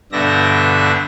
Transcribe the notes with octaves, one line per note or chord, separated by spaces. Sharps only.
G2 B2 D3 D4 E5 A#6